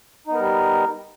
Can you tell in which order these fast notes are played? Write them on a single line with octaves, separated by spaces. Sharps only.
D#4 B3 A#4 G3